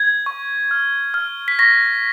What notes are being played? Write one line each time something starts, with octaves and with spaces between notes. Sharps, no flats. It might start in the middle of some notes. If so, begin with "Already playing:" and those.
Already playing: G#6
C#6
F6
F6
B6
C#6 A#6